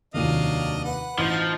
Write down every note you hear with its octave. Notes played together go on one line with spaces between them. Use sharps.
F1 D#2 F#3 D4 D#5 F5 D#7
B4 F#5
A1 F3 D#4 C5